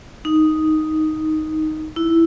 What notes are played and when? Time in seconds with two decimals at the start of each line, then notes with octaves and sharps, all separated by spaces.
0.25 D#4
1.96 E4